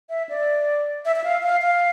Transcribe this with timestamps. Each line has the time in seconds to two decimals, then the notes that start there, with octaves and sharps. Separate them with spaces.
0.09 E5
0.29 D5
1.05 E5
1.16 E5
1.24 F5
1.43 F5
1.62 F5